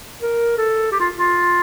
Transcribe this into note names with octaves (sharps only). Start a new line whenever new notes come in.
A#4
A4
G4
F4
F4